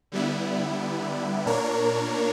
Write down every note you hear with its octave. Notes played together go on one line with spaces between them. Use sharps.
D3 G3 B3 E4
A#2 A#3 D4 A#4 C#5